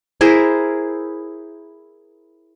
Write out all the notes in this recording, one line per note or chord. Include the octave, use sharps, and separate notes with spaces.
E4 G#4 A#4 C5